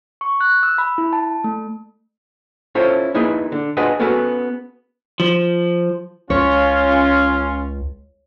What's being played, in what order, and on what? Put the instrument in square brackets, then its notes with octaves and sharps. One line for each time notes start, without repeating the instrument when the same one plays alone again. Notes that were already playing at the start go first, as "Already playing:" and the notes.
[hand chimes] C#6
F#6
E6
B5
E4
A5
A3
[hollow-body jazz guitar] C#4 E4 F4 A4 C5 C#5
A#3 D#4 E4 G#4 B4
D3
D4 F4 F#4 G#4 B4 D#5
B3 C#4 F#4 G#4 A4 B4
[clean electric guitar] F3
[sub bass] C#2 [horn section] C#4 F4 [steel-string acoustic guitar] C#5